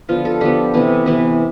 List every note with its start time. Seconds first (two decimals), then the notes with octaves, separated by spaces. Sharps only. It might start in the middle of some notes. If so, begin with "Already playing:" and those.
0.09 D3 F3 B3 F4
0.25 A4
0.41 D3 F3 B3 G4
0.74 C3 E3 B3
1.06 C3 E3 B3